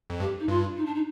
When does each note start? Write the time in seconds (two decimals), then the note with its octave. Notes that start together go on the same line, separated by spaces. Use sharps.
0.10 F2
0.20 G2 G4
0.39 D#4
0.48 G2 F4
0.77 D#4
0.85 D4
0.94 D#4